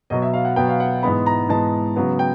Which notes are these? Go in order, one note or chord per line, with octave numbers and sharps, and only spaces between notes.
B2 F#3 B3 D#5
E5
F5
F#5
B2 F#3 B3 G5
F5
F#5
G#2 E3 G#3 B3 B5
A#5
G#2 E3 G#3 B3 A5
C#3 F#3 B3
G5